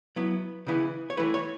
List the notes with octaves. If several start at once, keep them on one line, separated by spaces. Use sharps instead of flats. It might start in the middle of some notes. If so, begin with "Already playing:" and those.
F#3 B3 E4
C#3 E3 B3 E4
C#5
E3 A3 E4 B4
C#5